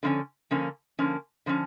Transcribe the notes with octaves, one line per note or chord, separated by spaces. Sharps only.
D3 F3 A#3 C#4
D3 F3 A#3 C#4
D3 F3 A#3 C#4
D3 F3 A#3 C#4